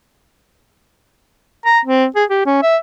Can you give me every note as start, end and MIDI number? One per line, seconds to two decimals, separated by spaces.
1.65 1.80 82
1.85 2.06 60
2.16 2.24 68
2.30 2.41 67
2.46 2.62 61
2.63 2.77 76